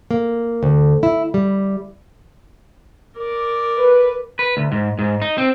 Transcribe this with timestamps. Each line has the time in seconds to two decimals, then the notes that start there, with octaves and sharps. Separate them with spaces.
0.11 A#3
0.63 D2
1.03 E4
1.34 G3
3.18 A#4 D5
3.78 B4
4.39 B4
4.57 D2
4.72 G#2
4.99 G#2
5.22 D#4
5.38 C4